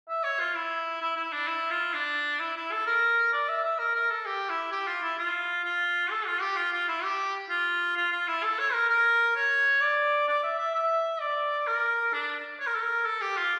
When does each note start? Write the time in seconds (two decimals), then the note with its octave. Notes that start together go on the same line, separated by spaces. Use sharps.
0.10 E5
0.24 C#5
0.40 F4
0.55 E4
1.02 E4
1.16 E4
1.33 D4
1.48 E4
1.71 F4
1.94 D4
2.40 E4
2.57 E4
2.72 A4
2.87 A#4
3.33 D5
3.49 E5
3.64 E5
3.79 A#4
3.95 A#4
4.11 A4
4.26 G4
4.49 E4
4.72 G4
4.87 F4
5.03 E4
5.18 F4
5.65 F4
6.11 A4
6.27 F4
6.41 G4
6.57 F4
6.73 F4
6.88 E4
7.03 G4
7.50 F4
7.97 F4
8.12 F4
8.28 E4
8.43 A4
8.59 C#5
8.73 A#4
8.90 A#4
9.36 C#5
9.81 D5
10.28 D5
10.43 E5
10.59 E5
10.74 E5
11.21 D5
11.67 A#4
12.13 D4
12.60 C#5
12.66 A#4
12.75 A4
12.83 A#4
13.06 A4
13.21 G4
13.37 F4